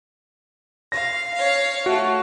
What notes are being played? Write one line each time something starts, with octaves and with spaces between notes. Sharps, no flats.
F5 A#6
C#5 F5
A3 F#4